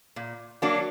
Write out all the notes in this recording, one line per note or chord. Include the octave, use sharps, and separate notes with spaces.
A#2
F#3 A#3 D4 F#4